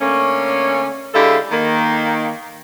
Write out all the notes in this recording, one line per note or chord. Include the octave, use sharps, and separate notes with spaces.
D3 A3 A#3 C#4
D3 G#3 E4 G4 A4 F5
D#3 A#3